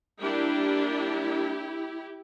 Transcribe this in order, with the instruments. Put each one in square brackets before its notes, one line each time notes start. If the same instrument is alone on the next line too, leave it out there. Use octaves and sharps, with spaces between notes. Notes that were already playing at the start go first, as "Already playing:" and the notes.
[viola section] G3 A#3 D4 E4 G4